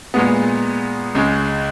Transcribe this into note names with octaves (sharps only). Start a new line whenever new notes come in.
A#2 G#3 B3
C#2 C#3 G#3